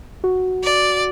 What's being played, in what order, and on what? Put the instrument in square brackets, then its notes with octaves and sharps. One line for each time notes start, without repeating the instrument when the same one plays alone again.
[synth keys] F#4
[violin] D5